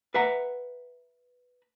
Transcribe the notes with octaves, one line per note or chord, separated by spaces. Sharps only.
B4 E5 F#5 A#5